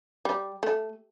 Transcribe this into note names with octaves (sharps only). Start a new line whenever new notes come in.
G3
A3